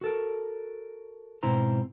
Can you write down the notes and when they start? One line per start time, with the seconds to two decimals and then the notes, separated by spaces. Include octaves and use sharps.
0.01 F#4 A4 A#4
1.43 G#2 B2 C4 E4 C5 A#5